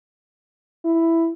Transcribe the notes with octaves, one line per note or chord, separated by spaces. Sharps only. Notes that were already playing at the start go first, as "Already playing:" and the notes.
E4